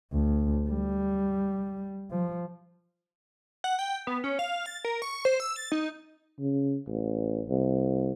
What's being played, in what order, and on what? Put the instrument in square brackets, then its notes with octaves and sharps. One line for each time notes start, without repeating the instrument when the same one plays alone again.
[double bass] D2
G3
F3
[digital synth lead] F#5
G5
B3
C#4
F5
A6
A#4
C#6
C5
E6
A6
D#4
[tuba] C#3
A1
C2